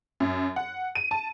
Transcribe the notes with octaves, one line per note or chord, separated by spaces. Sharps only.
F#2
F#5
D#7
A5